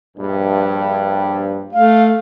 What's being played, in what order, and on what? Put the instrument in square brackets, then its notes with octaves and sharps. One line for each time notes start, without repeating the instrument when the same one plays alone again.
[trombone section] A#1 G2
[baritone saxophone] A3 [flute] F5